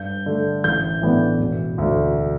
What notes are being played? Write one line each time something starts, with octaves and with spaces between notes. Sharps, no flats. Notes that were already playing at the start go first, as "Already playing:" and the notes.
Already playing: G2 G6
D3 A3
A1 G6
A2 E3 B3 D4
E1
D2 D3